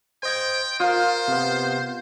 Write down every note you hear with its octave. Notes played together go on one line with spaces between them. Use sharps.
C5 D#5 G5 G#6
F4 A#4 C5 D#6
C3 B3